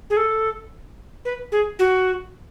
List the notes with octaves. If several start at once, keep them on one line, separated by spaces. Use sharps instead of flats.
G#4
A4
B4
G#4
F#4